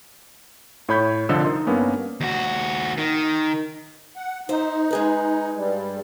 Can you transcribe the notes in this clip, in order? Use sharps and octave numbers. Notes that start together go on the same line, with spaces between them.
A2 C#5 B5 G6 G#6 B6
C2 D3 F3 A4 D#5 E6
D#4 A#4 D#5 C6
G2 A#3 B3 C#4
D#2 F#4
D#3
F#5
D#4 C5 E5
G#3 G#4 B4
G2 G3